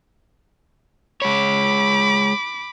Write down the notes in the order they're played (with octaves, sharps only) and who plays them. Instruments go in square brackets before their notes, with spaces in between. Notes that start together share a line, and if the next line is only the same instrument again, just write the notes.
[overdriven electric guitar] G#3 C#5 [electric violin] B5 D6